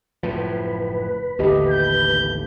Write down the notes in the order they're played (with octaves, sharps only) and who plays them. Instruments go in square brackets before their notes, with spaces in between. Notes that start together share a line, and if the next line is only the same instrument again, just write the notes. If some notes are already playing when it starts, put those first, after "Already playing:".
[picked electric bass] F#1 A2 F3 [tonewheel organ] B4
[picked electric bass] A1 D#2 A3 [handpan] D3 G4 D#5
[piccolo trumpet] G6